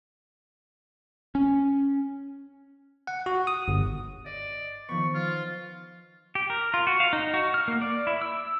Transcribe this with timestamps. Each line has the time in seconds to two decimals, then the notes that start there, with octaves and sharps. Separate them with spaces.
1.35 C#4
3.07 F#5
3.26 F#4
3.47 D#6
3.68 G1
4.26 D5 D#5
4.89 D#3 F3 B3 C#6
5.14 F4
6.35 G4
6.50 A#4
6.74 F4
6.87 F#4
7.00 F5
7.13 D#4
7.34 F#4
7.54 F6
7.68 A#3
7.82 D5
8.07 E4
8.22 E6